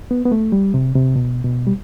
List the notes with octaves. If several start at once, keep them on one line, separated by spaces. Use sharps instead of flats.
B3
B3
A3
G3
C3
C3
B2
B2
G3